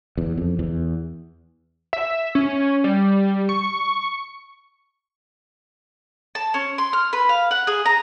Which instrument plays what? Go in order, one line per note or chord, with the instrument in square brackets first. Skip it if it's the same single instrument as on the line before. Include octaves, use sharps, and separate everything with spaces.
[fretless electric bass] E2
F2
E2
[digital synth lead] E5
C#4
G3
C#6
[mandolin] A5
C#4
C6
F6
B4
F5
F#5
G#4
A#5